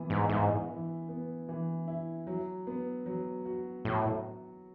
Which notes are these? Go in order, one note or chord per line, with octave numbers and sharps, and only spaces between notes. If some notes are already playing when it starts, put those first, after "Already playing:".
Already playing: E3 B3
G#2
G#2 E4
E3
B3
E3
E4
F#3
B3
F#3
F#4
A2 F#3